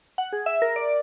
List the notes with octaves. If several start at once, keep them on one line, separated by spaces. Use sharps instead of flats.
F#5
G#4
E5
A#4
D5